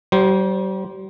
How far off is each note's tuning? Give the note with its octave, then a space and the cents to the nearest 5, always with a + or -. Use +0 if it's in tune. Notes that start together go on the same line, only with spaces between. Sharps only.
G3 -40 C5 +0